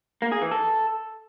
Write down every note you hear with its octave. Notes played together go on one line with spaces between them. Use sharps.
A#3
G#4
E3
A4